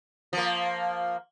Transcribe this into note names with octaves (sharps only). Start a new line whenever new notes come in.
F3 A#3